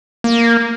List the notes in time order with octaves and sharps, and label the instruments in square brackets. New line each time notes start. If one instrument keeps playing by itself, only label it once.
[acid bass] A#3